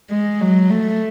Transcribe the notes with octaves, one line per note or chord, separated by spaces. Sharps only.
G#3
F#3
A3